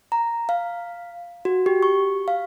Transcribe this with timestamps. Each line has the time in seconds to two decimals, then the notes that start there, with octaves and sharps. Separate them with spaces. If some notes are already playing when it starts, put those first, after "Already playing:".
0.12 A#5
0.49 F5
1.45 F#4
1.66 G4
1.83 C#6
2.28 F5